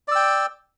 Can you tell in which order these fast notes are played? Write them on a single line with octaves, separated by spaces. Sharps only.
D5 E6 G5